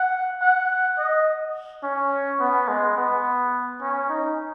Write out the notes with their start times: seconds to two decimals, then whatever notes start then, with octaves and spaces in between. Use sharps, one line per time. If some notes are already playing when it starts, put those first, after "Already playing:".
Already playing: F#5
0.41 F#5
0.98 D#5
1.83 C#4
2.40 B3
2.68 G#3
2.97 B3
3.81 C#4
4.09 D#4